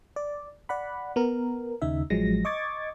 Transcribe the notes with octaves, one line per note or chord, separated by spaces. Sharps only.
D5
D5 F#5 B5
B3 A#4
D#2 C#3 D#4 E5
A1 F3 F#3 G#3 A#6
D#5 C#6 D6 G#6 A6